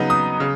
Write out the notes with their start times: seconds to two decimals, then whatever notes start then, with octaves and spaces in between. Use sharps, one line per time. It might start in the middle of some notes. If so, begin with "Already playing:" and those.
Already playing: C#3 F#3 B3 D#4
0.10 D#6
0.40 C#3